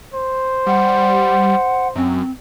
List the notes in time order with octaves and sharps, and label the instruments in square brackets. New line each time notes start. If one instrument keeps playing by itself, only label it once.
[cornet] C5
[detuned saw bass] G3 [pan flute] F#5
[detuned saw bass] F#2 [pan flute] C4